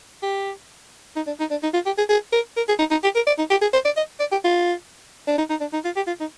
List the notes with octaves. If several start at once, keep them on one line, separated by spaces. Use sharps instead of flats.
G4
D#4
D4
D#4
D4
D#4
F4
G4
G#4
G#4
A#4
A#4
G#4
D#4
D#4
G4
A#4
D5
D#4
G4
G#4
C5
D5
D#5
D5
G4
F4
D4
D#4
D#4
D4
D#4
F4
G4
F4
D#4